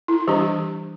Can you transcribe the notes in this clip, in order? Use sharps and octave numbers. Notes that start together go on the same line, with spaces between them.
E4
E3 G3 D4 G4